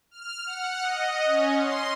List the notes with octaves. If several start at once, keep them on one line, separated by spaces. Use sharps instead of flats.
F6
F#5
D#5
C#4
C6